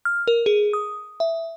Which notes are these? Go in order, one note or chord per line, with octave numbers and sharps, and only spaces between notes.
F6
A#4
G#4
D#6
E5